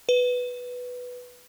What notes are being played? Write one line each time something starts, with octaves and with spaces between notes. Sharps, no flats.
B4